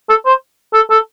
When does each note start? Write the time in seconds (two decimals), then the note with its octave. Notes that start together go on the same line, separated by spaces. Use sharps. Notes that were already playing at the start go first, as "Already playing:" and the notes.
0.09 A4
0.26 C5
0.73 A4
0.90 A4